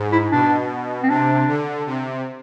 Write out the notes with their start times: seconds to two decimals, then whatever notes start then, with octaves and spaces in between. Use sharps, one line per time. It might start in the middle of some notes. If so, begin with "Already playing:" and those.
Already playing: G#2
0.12 E4
0.31 B2 D4
1.03 C4
1.09 C3 D4
1.48 D3
1.86 C3